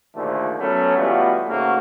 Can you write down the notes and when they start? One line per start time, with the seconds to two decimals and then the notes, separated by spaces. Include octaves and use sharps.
0.15 D#2 A#2 D3 F3 A3 G#4
0.59 F#3 A3 B3 C#4
0.97 E3 G3 A3 B3 F4 F#4
1.47 G#2 C#3 A3 A#3 F#4